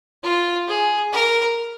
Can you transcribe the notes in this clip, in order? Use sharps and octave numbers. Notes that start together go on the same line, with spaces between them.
F4
G#4
A#4